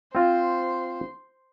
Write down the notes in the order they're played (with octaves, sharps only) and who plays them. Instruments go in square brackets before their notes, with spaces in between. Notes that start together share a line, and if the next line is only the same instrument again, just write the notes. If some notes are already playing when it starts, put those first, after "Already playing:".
[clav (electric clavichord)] C4 F4 [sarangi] C5